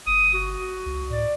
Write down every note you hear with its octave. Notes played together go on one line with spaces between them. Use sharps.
G1 D#6
F#4
C#2
A2 D5